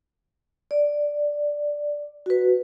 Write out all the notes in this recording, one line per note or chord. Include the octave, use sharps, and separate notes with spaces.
D5
F#4 B4